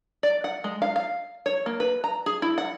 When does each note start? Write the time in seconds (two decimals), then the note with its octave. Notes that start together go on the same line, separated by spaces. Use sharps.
0.23 D5
0.44 F#5
0.64 G#3
0.82 F5
0.96 F5
1.46 C#5
1.66 A#3
1.80 B4
2.04 A#5
2.26 G#4
2.42 E4
2.58 F#5